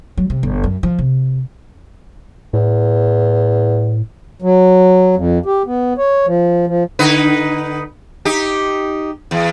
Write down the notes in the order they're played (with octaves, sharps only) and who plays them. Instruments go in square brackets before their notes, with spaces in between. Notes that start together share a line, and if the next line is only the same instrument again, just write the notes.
[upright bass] F#3
C3
G1
F#2
F3
C3
[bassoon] E2 [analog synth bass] A2
[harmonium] F#3
F2
G4
B3
C#5
F3
F3
[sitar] D3 D#4 B4
D#4 G4
E2